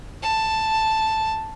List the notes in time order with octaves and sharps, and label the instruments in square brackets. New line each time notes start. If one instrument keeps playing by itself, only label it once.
[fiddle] A5